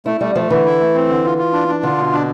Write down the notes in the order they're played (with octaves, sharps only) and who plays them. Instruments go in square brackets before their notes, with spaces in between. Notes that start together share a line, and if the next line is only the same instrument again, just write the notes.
[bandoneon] A3 [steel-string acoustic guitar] E4
[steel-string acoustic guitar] G3 [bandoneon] A3
[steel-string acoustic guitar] F3 [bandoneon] A3
[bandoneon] D3 [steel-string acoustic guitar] E3
[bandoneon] E4
A3
C4
D3
F4
F4
D4
D4
[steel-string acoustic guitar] D3 [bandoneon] F4
[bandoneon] B2
D4